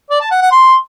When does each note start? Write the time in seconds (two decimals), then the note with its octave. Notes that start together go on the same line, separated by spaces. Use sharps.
0.10 D5
0.21 A5
0.31 F#5
0.41 F#5
0.52 C6